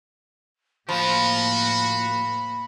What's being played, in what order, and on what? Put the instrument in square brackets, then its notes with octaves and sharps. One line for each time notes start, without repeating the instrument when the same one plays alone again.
[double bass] A2 A#3 [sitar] F3 [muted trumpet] F#4 [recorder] B5